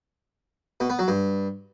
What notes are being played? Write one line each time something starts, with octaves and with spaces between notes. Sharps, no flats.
B2
B3
F#3
G2